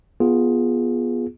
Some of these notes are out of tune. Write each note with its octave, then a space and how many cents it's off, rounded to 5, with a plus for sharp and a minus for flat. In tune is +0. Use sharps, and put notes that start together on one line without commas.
B3 -15 F4 +0 G#4 +0